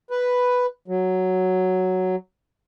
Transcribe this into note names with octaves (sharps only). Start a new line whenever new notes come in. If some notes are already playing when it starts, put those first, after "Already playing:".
B4
F#3